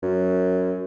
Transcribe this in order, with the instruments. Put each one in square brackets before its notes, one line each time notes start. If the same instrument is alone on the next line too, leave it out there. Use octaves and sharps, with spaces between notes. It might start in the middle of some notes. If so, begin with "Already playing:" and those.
[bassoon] F#2